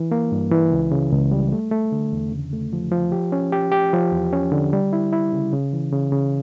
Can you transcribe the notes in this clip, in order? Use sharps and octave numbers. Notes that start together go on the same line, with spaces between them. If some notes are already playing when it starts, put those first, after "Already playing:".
Already playing: E3
A#3
G2
E3
C#2
C#3
C#2
G3
A3
A3
D3
E2
C#3
A3
F3
F3
G4
C#4
G4
G4
F3
E2
C#4
D3
G3
E4
E4
C#3
C#3
E3
C#3
C#3